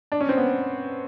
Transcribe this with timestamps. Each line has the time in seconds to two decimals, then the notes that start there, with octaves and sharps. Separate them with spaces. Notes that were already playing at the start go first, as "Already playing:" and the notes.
0.12 D4
0.21 C#4
0.29 C4
0.37 B3